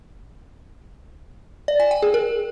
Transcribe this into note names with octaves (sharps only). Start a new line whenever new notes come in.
D5
G#5
G5
G#4
A#4